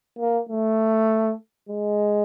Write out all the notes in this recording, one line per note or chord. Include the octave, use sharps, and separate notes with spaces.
A#3
A3
G#3